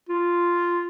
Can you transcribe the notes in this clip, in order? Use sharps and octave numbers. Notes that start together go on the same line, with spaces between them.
F4